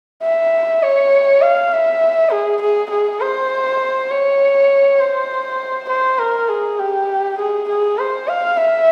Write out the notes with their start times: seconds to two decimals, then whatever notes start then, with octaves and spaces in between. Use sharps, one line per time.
0.23 E5
0.83 C#5
1.41 F5
1.72 E5
2.31 G#4
2.61 G#4
2.90 G#4
3.21 C5
4.10 C#5
5.00 C5
5.89 C5
6.19 A#4
6.49 G#4
6.79 G4
7.38 G#4
7.69 G#4
7.98 C5
8.28 F5
8.57 E5